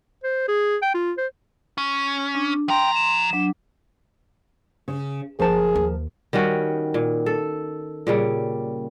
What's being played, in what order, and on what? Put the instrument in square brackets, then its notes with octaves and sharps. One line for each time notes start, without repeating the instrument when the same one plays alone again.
[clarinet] C5
G#4
G5
F4
C5
[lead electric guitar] C#4
[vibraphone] D4
[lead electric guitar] F3 A#5 [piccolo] G5 [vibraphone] C6
[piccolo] E7
[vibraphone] F#3 D4
[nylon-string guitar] C#3
[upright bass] F#1 [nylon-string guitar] F3 A#4 A5 [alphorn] G#4
[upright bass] D#2
[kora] D#3 G3 C#4 F#4
A#2
A4
A#2 C#3 G3